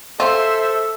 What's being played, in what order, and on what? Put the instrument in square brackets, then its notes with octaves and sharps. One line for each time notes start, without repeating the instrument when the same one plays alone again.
[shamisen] F4 [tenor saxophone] A4 [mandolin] C5 [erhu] E5